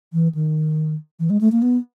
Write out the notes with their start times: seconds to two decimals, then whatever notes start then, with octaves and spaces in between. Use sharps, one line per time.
0.13 E3
0.35 D#3
1.19 E3
1.30 G#3
1.41 A3
1.52 A#3
1.62 B3